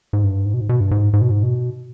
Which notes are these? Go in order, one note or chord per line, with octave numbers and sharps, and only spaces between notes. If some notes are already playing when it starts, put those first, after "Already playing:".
G#2
G2
G#2
B2
G#2
B2
G2
G#2
G#2
B2
G#2
B2